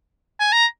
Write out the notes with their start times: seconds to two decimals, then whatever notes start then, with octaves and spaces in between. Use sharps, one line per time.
0.40 G#5
0.53 A#5